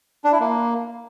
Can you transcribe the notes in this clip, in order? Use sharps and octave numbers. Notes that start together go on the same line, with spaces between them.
D4
E4
A#3